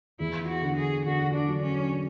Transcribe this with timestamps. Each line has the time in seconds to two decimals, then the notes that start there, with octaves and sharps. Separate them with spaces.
0.20 E2 E4
0.49 F#4
0.62 D3
0.77 G#4
1.06 D3 F#4
1.35 D4
1.48 F#3
1.63 C#4